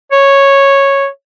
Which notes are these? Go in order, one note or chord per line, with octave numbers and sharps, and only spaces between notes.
C#5